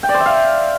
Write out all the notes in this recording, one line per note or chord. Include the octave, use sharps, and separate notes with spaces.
G5
D5
C5
E5
F5